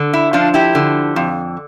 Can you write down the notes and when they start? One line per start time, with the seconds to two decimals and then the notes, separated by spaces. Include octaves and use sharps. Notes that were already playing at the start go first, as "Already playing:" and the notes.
Already playing: D3
0.13 E4
0.33 F3 D4 F4
0.54 E4 G4
0.75 D3
1.16 F2